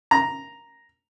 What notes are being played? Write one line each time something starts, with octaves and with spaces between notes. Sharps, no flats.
A#5